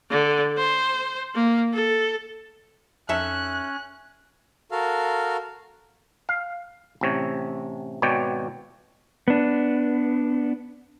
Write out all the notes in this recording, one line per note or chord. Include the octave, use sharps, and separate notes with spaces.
D3
C5
A#3
A4
F2 C#4 D#4 A4 E5 F#6
F#4 A4 A#4 F5
F5
A1 C3 C#5
G#1 B2 C#5 D5 G5
B3 D4